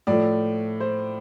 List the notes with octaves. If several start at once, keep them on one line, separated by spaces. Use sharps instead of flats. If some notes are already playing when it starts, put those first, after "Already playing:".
A2 F3 A3 D5
C5